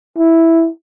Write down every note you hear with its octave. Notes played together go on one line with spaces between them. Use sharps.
E4